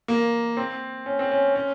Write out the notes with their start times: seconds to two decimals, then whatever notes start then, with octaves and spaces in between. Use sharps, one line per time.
0.08 A#3
0.57 C4
1.06 C#4
1.19 C4
1.31 C#4
1.55 C#4